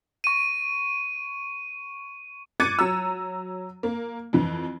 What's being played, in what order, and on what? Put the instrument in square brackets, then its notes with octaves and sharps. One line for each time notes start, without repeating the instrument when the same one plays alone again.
[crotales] C#6 D#7
[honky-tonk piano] D6 F#6 G#6 A6 C#7 D#7
F#3 A#5 E6
A#3
F2 E3